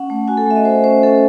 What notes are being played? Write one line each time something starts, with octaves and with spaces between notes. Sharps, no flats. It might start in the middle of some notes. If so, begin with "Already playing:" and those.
Already playing: C#4 F#5
A3
F#4 G#5
A4
A3 E5
D#5
F#4 C5
C#4 C5
C#4 A4